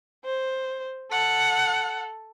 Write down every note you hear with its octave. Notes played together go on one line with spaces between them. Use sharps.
C5
A4 F#5